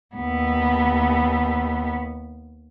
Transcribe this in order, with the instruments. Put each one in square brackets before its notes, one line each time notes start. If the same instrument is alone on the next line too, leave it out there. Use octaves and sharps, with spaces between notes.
[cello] D#2 B3